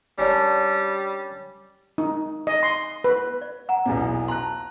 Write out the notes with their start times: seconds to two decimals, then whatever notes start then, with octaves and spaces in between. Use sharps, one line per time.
0.18 G3 C#4 D4 A#4
1.98 D#4
2.47 D#5
2.63 C6
3.04 B4
3.41 D5
3.69 F#5 G#5 A#5
3.86 B1 E2 B2
4.28 A5 A#5 C6 F#6